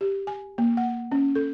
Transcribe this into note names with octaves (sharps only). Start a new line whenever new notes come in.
G4
G#5
A#3
F#5
C#4
A4